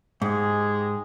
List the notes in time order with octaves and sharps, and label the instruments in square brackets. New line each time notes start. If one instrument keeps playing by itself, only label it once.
[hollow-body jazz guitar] G#2 [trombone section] G#3 G4 G#4